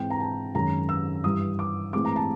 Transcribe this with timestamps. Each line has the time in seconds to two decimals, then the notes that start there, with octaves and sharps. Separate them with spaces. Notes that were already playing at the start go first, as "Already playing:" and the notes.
Already playing: G#2 E3 G#3 C4 G5
0.10 A#5
0.20 A5
0.54 F#2 D#3 G#3 C#4 A#5
0.89 E6
1.24 G2 E3 G3 D#6
1.59 D6
1.93 A2 E3 G#3 C4 D6
2.05 A#5
2.16 A5